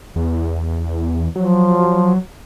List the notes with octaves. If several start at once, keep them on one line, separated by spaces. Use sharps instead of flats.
E2
F3 F#3